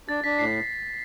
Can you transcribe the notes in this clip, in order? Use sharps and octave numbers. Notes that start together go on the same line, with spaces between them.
D4 A6
D4 B6
A2 C7